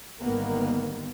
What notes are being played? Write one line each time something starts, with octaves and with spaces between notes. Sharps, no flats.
G#1 D3 D#3 G3 A#3 B3